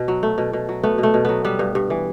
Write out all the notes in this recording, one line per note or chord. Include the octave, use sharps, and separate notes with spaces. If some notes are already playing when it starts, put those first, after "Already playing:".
Already playing: B2
F#3
A3
B2
B2
F#3
A3 B3
B2
A3
B2
F#3 B3
G3 B3
G2
G2
E3